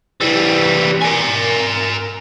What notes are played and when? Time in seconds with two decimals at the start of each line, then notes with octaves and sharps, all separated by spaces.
0.21 E3 G3
1.02 A#4 G#5